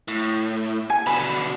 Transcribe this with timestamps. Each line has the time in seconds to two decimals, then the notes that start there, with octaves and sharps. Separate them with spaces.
0.08 A2
0.90 G#5
1.06 B2 D3 B5